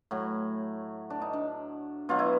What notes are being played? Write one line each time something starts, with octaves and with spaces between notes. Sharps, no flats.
A2 F#3
D4
D#4
D4
B2 F#3 F4
E4